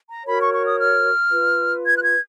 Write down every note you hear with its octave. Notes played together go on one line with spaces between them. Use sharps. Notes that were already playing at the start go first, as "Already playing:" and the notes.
A#5
F#4 A#4 C#5 B5
C#6
C#6
D#6
F6
F4 B4
G#6
F#6
G#6